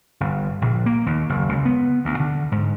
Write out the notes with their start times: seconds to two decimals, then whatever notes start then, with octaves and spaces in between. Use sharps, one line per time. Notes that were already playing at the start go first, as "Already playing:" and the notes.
0.20 G1
0.62 A#1
0.86 A#3
1.06 D#2
1.29 F#1
1.49 C#2
1.65 B3
2.05 D2
2.20 D3
2.52 G#2